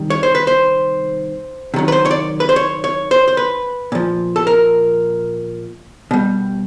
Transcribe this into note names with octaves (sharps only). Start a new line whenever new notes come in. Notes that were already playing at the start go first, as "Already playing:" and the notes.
Already playing: C3 D#3 G3
C#5
C5
B4
C5
C3 D#3 F#3
B4
C5
C#5
D5
B4
C5
C#5
C#5
C5
C5
B4
A#2 F3
A4
A#4
B2 G3